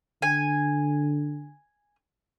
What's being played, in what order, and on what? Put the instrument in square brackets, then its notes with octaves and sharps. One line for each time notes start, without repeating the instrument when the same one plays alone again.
[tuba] D3 [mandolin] G#5